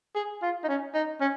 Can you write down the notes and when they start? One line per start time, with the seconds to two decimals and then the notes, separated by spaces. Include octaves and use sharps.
0.15 G#4
0.42 F4
0.64 D#4
0.68 C#4
0.94 D#4
1.20 C#4